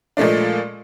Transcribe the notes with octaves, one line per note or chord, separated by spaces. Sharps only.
A#2 F3 G#3 A3 D4